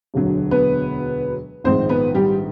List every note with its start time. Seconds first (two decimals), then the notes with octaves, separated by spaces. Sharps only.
0.14 E1 D2 D3 F#3
0.51 B3 B4
1.64 A#1 G#2 D#3 G#3 C4 C5
1.89 B3 B4
2.14 G3 G4